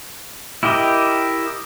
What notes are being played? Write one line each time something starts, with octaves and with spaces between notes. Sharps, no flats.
E4 G4 A#4 D#5